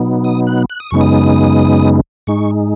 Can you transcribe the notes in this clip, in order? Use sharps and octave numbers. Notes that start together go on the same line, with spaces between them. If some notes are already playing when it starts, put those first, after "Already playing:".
Already playing: B2 F#3 B3 D#4
D#6
F#6
F#6
D#6
F#2 C#3 G#3 B3 D#4 C#6
D#6
G#2 G#3 D#4 C#6